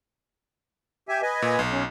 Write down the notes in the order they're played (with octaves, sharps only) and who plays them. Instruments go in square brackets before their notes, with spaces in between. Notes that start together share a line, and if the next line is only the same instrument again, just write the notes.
[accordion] G4 E5 G#5
B4 D#5 G#5
[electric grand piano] A#2
B1
[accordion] C#4